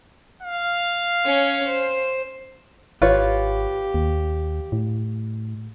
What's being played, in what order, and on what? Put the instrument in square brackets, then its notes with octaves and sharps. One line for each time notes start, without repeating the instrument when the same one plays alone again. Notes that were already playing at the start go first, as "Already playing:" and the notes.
[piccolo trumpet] F5
[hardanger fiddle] C#4 C#5
C5
[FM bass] G#1 [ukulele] F4 B4 C#5 [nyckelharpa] G4
[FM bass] D#2
A2